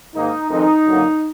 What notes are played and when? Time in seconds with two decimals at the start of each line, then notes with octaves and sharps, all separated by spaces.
0.14 G#2 D#3 A#3 D#4
0.50 F2 D#3 G#3 D#4
0.86 F#2 D3 F#3 A#3